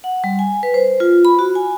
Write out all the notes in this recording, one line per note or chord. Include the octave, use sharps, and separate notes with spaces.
F#5
G3
G#5
B4
C5
F4
B5
F#4
G#5